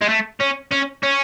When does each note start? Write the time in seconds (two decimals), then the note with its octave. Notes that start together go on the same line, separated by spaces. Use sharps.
0.01 G#3
0.09 A3
0.40 C#4
0.71 C#4
1.03 C#4